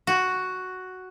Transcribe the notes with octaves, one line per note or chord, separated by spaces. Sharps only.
F#4